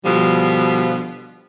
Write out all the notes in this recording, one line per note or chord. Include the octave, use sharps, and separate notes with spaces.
B2 D3 F3 G3